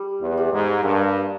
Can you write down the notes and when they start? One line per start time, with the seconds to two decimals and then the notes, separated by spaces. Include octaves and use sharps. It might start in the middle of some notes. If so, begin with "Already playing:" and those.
Already playing: G3
0.21 E2
0.37 G3
0.52 G#2
0.83 G2 A#3